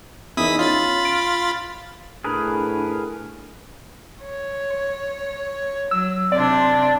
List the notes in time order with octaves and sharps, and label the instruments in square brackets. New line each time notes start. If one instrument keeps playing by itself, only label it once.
[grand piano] E2 D#4 A#4 [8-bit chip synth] E4 D#6 B6
[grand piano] C#4 [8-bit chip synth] F4 B5 A6
[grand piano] D7
[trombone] A2 [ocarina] D4 [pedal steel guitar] G#4 A#4 B4
[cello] C#5
[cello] F#3 [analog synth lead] E6
[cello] C3 D4 [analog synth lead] D5